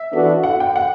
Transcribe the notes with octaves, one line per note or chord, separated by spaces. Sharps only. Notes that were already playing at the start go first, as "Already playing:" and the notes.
Already playing: E5
E3 B3 D4 F#4 A4
F#5
G5
F#5